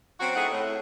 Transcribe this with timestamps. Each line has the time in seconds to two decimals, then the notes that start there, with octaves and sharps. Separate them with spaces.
0.20 F#3 C4 C#4 F#4
0.36 A3 C4 D#4 E4 G#4 F#5
0.51 A2